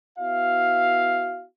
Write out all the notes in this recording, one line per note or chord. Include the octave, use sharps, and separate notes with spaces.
B3 E4 F#4 E5 F5